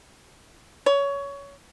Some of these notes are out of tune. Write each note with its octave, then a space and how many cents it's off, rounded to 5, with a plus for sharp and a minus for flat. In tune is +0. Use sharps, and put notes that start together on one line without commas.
C#5 +20